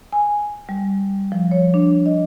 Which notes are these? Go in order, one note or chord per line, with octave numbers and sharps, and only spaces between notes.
G#5
G3
F3
C#5
D4
D#5